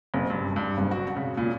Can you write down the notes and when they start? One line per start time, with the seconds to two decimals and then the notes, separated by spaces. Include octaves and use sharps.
0.14 F#1
0.30 G2
0.56 G2
0.77 F#1
0.91 F#4
1.16 C#3
1.37 A#2